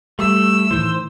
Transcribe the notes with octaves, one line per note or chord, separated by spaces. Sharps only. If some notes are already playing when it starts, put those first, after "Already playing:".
G3 A3 E6
A2 D#3 E3 C5